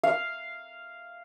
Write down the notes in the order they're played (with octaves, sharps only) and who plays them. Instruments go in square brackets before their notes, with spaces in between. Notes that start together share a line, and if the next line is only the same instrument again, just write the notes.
[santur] F5